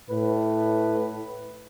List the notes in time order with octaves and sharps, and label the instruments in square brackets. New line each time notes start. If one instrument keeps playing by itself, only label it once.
[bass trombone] A2 [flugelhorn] B4